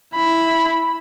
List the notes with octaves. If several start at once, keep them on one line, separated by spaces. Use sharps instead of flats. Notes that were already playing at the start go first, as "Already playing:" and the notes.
E4 B5